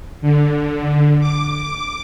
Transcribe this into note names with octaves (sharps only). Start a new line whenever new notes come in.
D3
D6